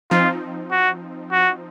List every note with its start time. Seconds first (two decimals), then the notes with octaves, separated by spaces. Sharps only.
0.11 F3 C4 D#4 F4
0.71 F#4
1.32 F#4